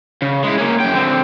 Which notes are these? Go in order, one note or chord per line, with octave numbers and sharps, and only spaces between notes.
C#3
G#3 E4
A#3 C#4
F#2 G5
D3 C4